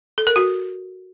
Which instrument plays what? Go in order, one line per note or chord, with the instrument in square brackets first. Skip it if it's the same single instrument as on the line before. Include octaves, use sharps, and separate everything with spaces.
[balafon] A4
A#4
F#4